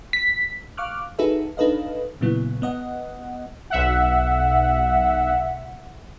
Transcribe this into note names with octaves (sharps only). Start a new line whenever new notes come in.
B6
F5 C#6 D6 F6 F#6
D#4 F#4 G#4 A4 B4 E5
D4 D#4 A4 B4 D#5 F5
A#2 C#3 F#3 B3 E4
B3 D#5 F#5
B1 E5 F#5